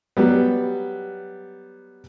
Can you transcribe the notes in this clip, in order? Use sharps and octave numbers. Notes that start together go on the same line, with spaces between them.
F#3 G3 B3